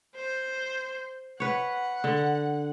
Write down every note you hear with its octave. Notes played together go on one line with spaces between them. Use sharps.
C5
B4 C#5 F#5
D3